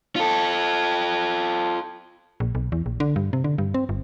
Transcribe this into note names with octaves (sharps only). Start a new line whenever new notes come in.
F4 A4
A#1
B1
E2
A#1
D3
G2
C3
D3
G2
C4
G1